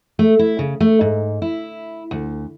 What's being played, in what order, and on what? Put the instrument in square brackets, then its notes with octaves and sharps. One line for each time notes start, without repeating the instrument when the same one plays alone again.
[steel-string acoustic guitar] A3
E4
C#3
A3
G#2
E4
D2